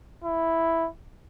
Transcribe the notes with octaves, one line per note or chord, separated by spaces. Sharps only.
E4